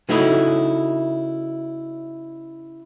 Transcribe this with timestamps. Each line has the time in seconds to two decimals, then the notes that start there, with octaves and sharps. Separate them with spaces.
0.09 C#3 F#3 A3 D#4 E4